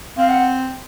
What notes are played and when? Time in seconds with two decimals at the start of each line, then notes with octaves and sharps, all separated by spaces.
0.18 C4 F5
0.30 F#5